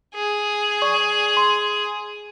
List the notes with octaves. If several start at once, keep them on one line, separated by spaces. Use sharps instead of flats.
G#4
D5 C#6
C6